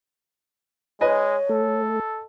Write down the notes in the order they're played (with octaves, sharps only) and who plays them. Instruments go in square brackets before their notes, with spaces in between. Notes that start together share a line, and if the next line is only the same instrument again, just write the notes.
[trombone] G#3 [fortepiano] B4 D#5 G#5 [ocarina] C#5
[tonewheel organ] A3 [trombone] A4